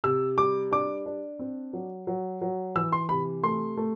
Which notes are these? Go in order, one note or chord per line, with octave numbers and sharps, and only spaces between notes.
C3 E6
G3 D6
D4 D6
D4
C4
F#3
F#3
F#3
E3 E6
C6
C3 B5
A3 C6
A3